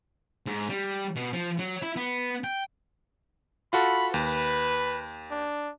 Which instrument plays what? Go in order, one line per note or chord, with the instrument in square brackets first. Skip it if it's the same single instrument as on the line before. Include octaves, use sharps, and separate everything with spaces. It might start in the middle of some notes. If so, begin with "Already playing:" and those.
[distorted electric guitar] G#2
G3
B2
F3
F#3
E4
B3
G5
[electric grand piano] F4 F#4 A4 [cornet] B5
[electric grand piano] D#2 [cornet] B4
[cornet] D4